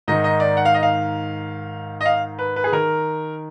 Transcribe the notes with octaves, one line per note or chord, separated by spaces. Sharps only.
G#2 D#3 D#5
D#5
D5
F#5
F5
D#5
F5
D#5
F5
B4
B4
G#4
D#3 A#4